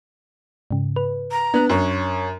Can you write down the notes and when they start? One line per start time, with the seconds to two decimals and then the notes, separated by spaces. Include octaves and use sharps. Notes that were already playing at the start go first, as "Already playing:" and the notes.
0.71 G#2 C#3
0.96 B4
1.31 A#5
1.54 B3 D4 F#6
1.69 F#2 C#5